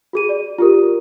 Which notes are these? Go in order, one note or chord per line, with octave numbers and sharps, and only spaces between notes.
F#4 G#4 D#7
D5
F4 G4 A#4